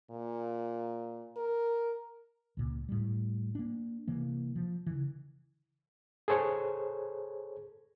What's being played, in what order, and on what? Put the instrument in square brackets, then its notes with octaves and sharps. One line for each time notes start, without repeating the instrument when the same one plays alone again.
[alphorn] A#2
A#4
[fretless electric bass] C#2 A#2
A2 G3
A#3 D4
C3 E3 A#3
F3
C#3 E3
[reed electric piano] G#4 A4 C5 C#5